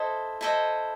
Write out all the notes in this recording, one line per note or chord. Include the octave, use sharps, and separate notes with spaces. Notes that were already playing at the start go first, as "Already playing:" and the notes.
Already playing: E4 A4 C5 D#5
E4 A4 C5 D#5